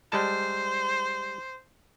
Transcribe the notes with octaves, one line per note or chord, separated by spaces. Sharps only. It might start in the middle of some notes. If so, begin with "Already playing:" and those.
G3 G#3 C5 A5